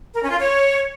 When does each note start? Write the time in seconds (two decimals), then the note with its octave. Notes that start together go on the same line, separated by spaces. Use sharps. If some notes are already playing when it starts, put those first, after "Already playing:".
0.15 A#4
0.23 C#4
0.31 F4
0.39 C#5